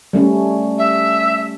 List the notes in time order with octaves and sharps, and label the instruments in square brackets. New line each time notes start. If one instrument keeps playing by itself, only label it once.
[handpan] G3 A3 C#4
[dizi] E5